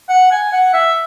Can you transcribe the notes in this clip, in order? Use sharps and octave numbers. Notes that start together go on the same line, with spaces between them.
F#5
G#5
F#5
E5